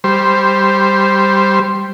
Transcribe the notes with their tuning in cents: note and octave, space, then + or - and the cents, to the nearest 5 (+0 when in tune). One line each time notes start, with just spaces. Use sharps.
G3 +0 C5 +0